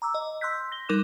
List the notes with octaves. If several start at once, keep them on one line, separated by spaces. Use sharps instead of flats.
A#5 D6 E6
D#5
C6 E6 F#6 G6 B6
A#6 G7
G3 D#4 A#4 D6 F#6 E7